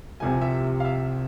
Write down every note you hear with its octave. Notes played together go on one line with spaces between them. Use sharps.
C2 C3 F3 G#5
E5
F5
E5